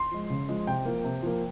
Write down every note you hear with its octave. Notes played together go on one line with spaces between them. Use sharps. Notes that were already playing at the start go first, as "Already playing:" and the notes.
Already playing: C6
F3 G#3
C#3
F3 G#3
C3 G5
F3 A#3
C3
F3 A#3